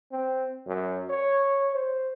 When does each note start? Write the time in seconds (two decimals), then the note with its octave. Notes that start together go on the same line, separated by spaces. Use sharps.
0.11 C4
0.66 F#2
1.10 C#5
1.75 C5